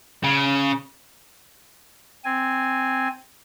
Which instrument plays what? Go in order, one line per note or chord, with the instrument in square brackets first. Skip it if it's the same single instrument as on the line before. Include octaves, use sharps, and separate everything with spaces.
[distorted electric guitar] C#3
[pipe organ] C4 G#5